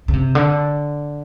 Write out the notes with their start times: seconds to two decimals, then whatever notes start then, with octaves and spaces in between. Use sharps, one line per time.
0.08 C#3
0.13 C3
0.35 D3